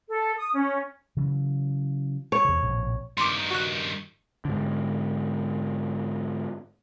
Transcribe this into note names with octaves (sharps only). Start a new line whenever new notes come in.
A4
D#6
C#4
C#3 E3 F#3
C#5
E2 C3
A#1 A2 C3
G2 D#3 C6 D6
F#4 F#6
G#2 D3